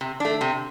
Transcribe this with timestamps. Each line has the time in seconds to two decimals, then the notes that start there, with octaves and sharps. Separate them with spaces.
0.01 C3
0.20 A3 D4
0.41 C3